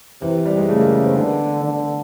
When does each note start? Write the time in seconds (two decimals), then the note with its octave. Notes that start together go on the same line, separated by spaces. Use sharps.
0.21 C3 E3
0.45 G3
0.57 G#3
0.69 C#3 A3
0.81 A#3
0.93 B3
1.05 C4
1.16 D3 B3
1.64 D3